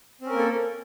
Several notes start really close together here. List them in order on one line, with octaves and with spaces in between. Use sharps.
C4 C#4 A#4 A#3 A4